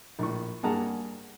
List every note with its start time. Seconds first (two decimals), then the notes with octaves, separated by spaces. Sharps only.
0.19 A#1 A2 C#6
0.63 G2 A#3 G#4 F#5 A5 A#5